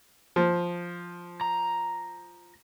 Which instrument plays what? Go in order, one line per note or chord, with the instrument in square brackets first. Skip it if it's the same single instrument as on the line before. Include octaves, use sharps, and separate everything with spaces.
[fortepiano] F3
[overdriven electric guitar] A#5